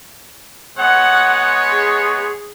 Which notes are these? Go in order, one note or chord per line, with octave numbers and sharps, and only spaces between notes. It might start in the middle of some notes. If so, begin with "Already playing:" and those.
G#3 B3 C#5 F#5
G#4